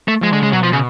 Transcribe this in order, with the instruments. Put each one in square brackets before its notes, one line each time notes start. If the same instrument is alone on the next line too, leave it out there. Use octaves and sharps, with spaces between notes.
[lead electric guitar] A3
[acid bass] F3 [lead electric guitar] G#3
[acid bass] D3 [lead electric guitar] G#3
[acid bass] C#3 [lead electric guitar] G#3
[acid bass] B2 [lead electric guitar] F#3
[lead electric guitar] F3
C#3